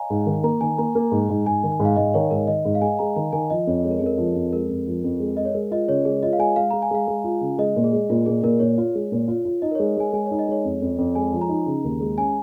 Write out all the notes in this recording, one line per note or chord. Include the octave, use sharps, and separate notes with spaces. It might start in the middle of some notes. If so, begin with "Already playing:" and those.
Already playing: C#5 D#5 F5 G#5 A#5
G#2
D#3
A#3 A#5
D#3 G#5
A#3 A#5
A#3
G#2
G#2
G#2 G#5
D#3
G#5
G#2
F5
G#2 D#5
D#3 C#5
G#2 A#4
D#3 D#5
G#2
F5
G#3 G#5
G#3 A#5
D#3 A#5
D#3 G#5
F3 D#5
F2 C#5
G#3 C#5
A#4
F2 G#4
A#4
F3
F2
G#3 A#4
F2
F3
F2
G#3
G#3 D#5
C#5
G#3 A#4
F4 D#5
C#3 C#5
G#3 G#4
F4 D#5
F5
G#3 G#5
G#3 F5
G#3 A#5
G#5
G#3 F5
G#3
F4
C#3
G#3 D#5
A#2
G#4
G#3
A#2 F4
A#2 G#4
A#2 A#4
A#2 C#5
F4
G#3
A#2
F4
F4
D#4 D#5
A#4
G#3 C#5
D#5
G#3 G#5
G#3 G#5
C#5
D#4
D#5
G#3 C#5
F2
F2
F2
G#3 G#5
F3
A#5
D#4
C#3
D#2
G#3
C#4 G#5